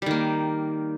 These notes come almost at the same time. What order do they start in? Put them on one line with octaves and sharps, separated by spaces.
G3 D#3 A#3